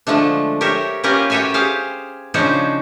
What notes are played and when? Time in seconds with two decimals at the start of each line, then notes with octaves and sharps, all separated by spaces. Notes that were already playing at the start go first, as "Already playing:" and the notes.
0.07 D3 F3 G#3 A3 D4
0.61 G4 A#4 C#5 E5
1.03 A#3 C#4 F4 G4 A#4 B4
1.30 F#4 G4 A4 C#5 E5 G#5
1.54 G4 G#4 C5 F5
2.34 C#3 F3 D4 D#4 C5 C#5